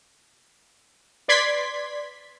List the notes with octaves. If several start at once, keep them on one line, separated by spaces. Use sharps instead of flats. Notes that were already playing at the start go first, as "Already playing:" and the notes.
B4 D5 C6 G#6 B6